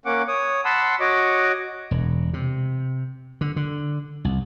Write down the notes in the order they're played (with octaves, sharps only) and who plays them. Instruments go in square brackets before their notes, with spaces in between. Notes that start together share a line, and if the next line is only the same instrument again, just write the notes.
[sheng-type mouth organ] A#3 C#4 F#5 D6
C#5 D#6
F#5 A5 B5 C6 E6
F#4 C#5 D#5 D6
[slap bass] E1
C3
D3
D3
C2